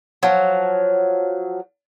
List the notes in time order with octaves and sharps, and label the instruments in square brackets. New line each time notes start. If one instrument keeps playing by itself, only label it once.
[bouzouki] F3 F#3